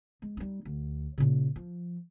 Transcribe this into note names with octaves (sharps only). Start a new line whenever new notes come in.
G#3
G3 D#4
D2
A#2 C#3
F3